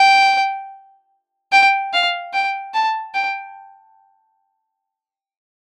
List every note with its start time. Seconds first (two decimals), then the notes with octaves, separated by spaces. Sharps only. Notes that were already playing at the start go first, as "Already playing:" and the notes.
Already playing: G5
1.52 G5
1.93 F5
2.33 G5
2.74 A5
3.14 G5